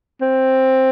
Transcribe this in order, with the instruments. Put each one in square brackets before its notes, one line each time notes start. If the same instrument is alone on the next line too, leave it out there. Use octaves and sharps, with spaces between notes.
[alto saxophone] C4